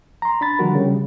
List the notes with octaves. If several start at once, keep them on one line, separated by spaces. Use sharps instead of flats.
A#5 C6
D4 B5 A6
D3 F3 G3 A3 F#4 A#4
C#3 G3